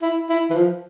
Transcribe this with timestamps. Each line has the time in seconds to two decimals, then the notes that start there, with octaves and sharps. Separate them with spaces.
0.02 E4
0.29 E4
0.50 E3
0.55 F3